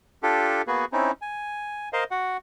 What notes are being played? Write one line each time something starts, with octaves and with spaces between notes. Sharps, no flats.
D4 F4 G4 A4
A#3 B3 F#4 G#4 B4
C4 C#4 D#4 E4
G#5
A#4 C5 D#5 F5
F#4 F#5